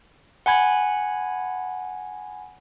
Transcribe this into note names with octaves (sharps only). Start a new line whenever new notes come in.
F#5 G#5 B5 G#6